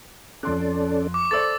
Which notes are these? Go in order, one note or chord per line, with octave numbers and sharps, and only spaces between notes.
F2 C#4 A4 D5 C6 F#6
C#6 D6
A4 C5 D5 E6 A6